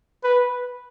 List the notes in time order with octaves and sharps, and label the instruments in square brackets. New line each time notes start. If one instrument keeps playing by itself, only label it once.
[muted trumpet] B4